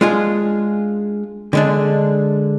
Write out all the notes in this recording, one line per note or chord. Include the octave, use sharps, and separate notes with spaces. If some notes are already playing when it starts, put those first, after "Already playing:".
G#3 D4 F4 G#4
D3 G#3 D4